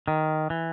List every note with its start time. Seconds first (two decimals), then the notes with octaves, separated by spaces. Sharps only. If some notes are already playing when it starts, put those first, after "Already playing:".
0.08 D#3
0.50 E3